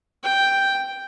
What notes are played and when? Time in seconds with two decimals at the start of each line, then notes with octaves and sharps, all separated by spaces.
0.24 G5